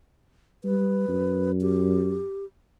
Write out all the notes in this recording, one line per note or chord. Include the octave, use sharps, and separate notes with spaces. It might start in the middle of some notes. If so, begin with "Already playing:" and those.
G3 B4
F#2
G4